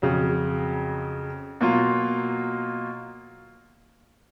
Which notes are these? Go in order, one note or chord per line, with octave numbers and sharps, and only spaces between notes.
F2 C#3 F#3
B2 F#3 A#3 F4